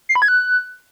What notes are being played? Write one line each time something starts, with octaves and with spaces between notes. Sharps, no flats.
C7
B5
G#6
F#6